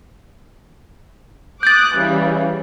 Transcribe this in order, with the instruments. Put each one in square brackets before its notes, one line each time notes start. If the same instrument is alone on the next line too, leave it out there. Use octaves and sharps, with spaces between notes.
[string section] D6 D#6 F#6 [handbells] G6 A6
[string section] C#3 E3 G3